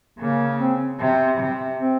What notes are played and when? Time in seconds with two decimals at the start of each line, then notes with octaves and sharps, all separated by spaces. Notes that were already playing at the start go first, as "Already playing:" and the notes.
0.19 C#3 A#3
0.60 C4
1.00 C3
1.40 C3
1.79 C4